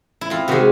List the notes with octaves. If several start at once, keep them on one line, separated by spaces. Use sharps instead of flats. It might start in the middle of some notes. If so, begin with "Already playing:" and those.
E4
F2 F4
C3 D#3 G#3 F#4